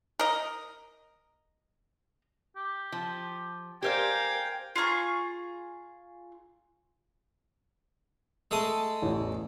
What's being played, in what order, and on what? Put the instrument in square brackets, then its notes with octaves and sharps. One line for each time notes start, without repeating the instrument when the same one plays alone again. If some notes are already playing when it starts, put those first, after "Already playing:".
[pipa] A#4 D#5
[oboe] G4
[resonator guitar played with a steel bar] F3
[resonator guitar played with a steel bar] G4 C5 D5 [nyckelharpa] A#4 F5 [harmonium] G5 [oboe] G#5
[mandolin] F4 G#4 A#5 C#6
[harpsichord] G#3 A3 D#6
[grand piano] A1 E2